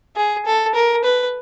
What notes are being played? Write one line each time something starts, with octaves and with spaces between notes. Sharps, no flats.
G#4
A4
A#4
B4